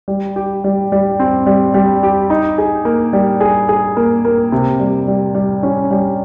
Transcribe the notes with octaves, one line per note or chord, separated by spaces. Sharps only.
G3
G4
G3
G3
C4
G3
G3
G4
D#4
G#4
A#3
G3
G#4
G#4
A#3
A#3
C3
G3
G3
G3
C#4
G3